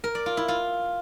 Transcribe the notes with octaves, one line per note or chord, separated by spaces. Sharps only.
A#4
D5
F4
E4
F4